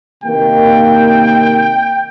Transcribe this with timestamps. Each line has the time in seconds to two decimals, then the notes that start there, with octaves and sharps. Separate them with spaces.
0.24 C3 D#3 A#3 G5